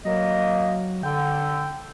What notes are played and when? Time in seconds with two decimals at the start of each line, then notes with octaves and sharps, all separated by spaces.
0.05 F#3 A#3 D#5
1.03 D3 G5